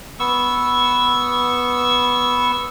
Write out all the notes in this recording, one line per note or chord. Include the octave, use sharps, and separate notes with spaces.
B3 C#6 E6